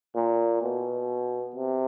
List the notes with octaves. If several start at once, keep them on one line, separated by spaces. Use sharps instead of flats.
A#2
B2
C3